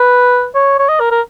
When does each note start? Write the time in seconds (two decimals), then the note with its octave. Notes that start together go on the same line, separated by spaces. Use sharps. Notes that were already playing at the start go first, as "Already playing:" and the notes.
Already playing: B4
0.54 C#5
0.79 C#5
0.89 D#5
1.00 A#4
1.11 A#4